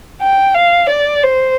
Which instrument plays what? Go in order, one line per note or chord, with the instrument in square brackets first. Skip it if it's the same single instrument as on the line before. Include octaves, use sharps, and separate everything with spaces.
[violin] G5
F5
D5
C5